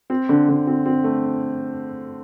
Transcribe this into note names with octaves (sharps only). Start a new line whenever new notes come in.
C4
D3
D3
C4
C4
A3